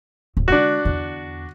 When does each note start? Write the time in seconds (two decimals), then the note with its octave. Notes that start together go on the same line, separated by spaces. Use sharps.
0.37 D1 C4
0.48 D3 G#3 D4 F#4
0.85 E2 D3